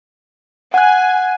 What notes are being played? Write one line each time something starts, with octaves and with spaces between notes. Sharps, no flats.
F#5 G#5 F#6